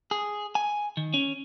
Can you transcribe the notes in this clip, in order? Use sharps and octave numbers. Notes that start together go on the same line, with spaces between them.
G#4
G#5
D#3
C#4